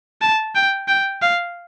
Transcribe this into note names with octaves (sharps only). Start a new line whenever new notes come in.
A5
G5
G5
F5